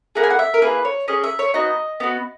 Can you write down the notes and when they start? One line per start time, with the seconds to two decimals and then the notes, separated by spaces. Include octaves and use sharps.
0.15 A#3 E4 G#4 F#5
0.23 G#5
0.30 F#5
0.39 E5
0.54 A#4
0.62 A#3 E4 G#4 B4
0.85 C#5
1.08 C#4 G#4 D#5
1.24 E5
1.39 C#5
1.54 B3 D#4 F#4 D#5
2.00 B3 D#4 F#4